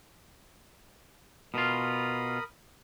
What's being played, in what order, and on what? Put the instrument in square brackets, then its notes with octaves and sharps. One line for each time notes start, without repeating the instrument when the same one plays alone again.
[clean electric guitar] B2 F4 [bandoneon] A#4 B5 D#6